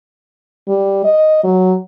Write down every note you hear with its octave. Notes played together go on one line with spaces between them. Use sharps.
G3
D#5
F#3